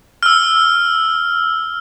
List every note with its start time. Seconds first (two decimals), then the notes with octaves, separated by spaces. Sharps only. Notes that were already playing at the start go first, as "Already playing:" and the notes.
0.23 E6 F6